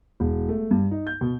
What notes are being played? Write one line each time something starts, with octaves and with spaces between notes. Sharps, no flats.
E1
A3
G2
D#4
G6
B2